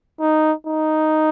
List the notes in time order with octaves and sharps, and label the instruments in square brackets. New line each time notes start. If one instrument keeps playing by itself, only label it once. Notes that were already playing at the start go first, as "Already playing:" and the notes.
[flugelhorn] D#4
D#4